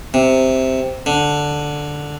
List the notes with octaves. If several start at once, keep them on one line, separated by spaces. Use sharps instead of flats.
C3
D3